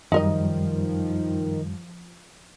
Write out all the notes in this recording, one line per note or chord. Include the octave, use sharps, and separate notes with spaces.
F#2 D#3 F3 G3 D#4 A#4 D#5